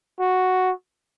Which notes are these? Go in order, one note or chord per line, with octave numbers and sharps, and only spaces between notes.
F#4